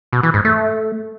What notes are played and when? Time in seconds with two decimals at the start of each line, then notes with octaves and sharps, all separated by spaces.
0.13 B2
0.23 E3
0.34 G#2
0.45 A3